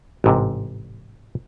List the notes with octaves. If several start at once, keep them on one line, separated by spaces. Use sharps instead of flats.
A1 G#2 C3